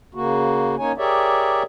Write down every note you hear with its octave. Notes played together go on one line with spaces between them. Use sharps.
C#3 A#3 F#4
A#3 C#4 D#4 C#5 G#5
G4 G#4 A#4 C#5 D5 E5